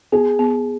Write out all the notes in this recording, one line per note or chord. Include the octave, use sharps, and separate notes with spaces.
B3 G#4
B3